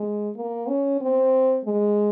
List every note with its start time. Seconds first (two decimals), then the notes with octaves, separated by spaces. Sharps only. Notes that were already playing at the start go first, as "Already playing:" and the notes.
Already playing: G#3
0.36 A#3
0.68 C#4
1.01 C4
1.65 G#3